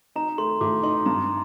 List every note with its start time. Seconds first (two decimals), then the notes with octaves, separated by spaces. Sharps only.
0.16 D#4 A#5
0.38 A3 C6
0.61 A2 D6
0.83 D#4 C6
1.06 G2 A#5